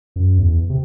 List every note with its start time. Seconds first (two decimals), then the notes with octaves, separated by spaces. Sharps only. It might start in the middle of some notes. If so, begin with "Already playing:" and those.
0.16 F#2
0.39 E2
0.70 C3